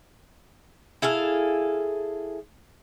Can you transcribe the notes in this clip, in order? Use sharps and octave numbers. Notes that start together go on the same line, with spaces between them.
E4 G#4 A4 F5